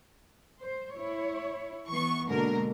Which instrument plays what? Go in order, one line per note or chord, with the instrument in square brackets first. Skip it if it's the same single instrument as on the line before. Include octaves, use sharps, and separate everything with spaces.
[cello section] C5
E4 C#5
[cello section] E3 B3 [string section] C#6
[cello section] B2 G#3 A#3 [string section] D3 A#4